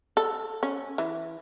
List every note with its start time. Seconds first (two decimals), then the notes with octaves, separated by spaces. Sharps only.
0.17 A4
0.63 C#4
0.98 E3